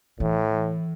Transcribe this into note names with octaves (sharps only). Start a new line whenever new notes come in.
A2 E3